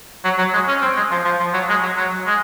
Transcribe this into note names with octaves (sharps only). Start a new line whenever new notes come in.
F#3
F#3
G#3
C#4
C4
G#3
F3
F3
F3
F#3
G#3
F#3
F#3
G#3